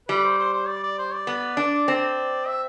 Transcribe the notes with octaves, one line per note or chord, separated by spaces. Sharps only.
G3 B4
C5
C5
C5
D5
D5
C5
D5
B3
D4
C4
E5